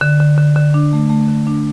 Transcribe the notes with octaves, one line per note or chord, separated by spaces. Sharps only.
D3
D3
D3
D3
D4
A3
A3
D3
D4